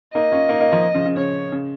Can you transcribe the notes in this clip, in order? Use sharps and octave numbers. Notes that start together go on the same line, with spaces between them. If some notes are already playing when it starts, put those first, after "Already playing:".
A#3 D#4 D#5
C#4 F4
A#3 D#4
A#3 D#4
F3 A#3
C#3 F3
C#3
C#3 C#5
C#3